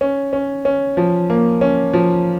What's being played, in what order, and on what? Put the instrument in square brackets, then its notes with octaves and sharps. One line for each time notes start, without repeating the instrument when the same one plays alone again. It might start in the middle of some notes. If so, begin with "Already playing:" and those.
[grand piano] C#4
C#4
C#4
F3
A#3
C#4
F3